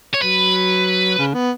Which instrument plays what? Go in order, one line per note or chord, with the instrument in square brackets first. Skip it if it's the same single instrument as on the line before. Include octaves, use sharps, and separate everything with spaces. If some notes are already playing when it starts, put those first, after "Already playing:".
[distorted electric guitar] C#5
[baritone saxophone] F#3 [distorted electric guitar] B4
[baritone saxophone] C#3
B3